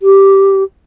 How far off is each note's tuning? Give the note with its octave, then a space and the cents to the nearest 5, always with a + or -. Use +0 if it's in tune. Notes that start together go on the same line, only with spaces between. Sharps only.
G4 -5